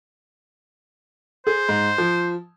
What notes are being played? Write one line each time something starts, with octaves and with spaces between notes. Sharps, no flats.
G#4 C5
G#2
F3